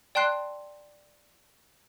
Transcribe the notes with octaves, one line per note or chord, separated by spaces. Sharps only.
D5 G5 A5 C6 F#6 C7